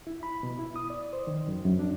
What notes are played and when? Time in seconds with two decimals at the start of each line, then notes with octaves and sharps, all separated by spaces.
0.07 E4
0.23 B5
0.43 B2
0.59 E4
0.76 D#6
0.90 D5
1.13 C5
1.27 D#3
1.48 F#2
1.65 F#2
1.79 D4